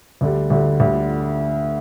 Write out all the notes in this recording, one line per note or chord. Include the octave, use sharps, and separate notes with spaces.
D2 D3 G3
D2 D3 G3
D2 D3 G3